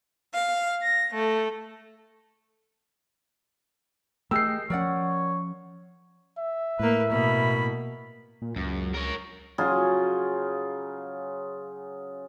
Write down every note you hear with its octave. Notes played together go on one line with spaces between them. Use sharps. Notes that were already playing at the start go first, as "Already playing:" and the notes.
F5
A#6
A3
A3 G4 G#4 A#4 D#5 G5 E6 C7
F3 C#4 A#4 C#5 D5 F#5
E5
A2 A#3 B4
B2 A#3 B3 B5
A#2
C#2 F#2
A#4 C#5
C#3 F#3 F4 G#4